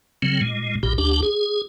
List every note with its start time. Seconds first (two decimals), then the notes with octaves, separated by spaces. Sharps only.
0.22 C#3 F#3 C4
0.41 A#2 G#3
0.83 B1 A#2 G4
0.98 D2 D4 G4
1.23 G#4